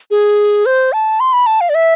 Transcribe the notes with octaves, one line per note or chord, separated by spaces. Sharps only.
G#4
C5
A5
C6
B5
A5
F5
D5
E5